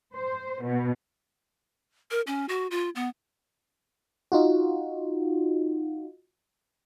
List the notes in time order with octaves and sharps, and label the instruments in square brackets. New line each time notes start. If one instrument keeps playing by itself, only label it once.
[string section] C5
B2
[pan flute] A#4
C#4
F#4
F4
B3
[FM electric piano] D#4 F4 F#4